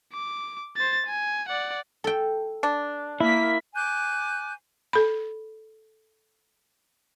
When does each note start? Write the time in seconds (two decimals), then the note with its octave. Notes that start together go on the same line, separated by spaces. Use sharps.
0.13 D6
0.76 C5 A6
1.06 G#5
1.49 D5 F#5
2.04 A4 G5
2.63 D4
3.20 A#3 E4 B6
3.76 G#5 D6 F#6 G6
4.93 A4 B5